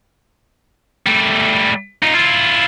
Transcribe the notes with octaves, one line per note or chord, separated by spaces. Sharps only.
G3 A3
D#4 F4
E4 F4